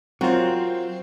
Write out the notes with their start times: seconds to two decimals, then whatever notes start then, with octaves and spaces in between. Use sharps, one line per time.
0.21 F#3 C4 F4 F#4 A#4 C5